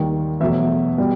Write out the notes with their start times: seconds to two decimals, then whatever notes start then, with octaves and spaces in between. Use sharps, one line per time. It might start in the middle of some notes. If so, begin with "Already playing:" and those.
Already playing: D#2 D#3 G3
0.40 E2 B2 F#3 A3 E5
0.98 B2 G3